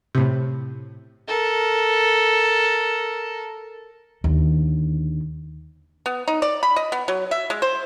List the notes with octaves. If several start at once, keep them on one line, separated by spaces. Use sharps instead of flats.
A2 C3
A4 A#4
D#2 D3
B3
D#4
D5
B5
D#5
B3
F#3
E5
G#3
C5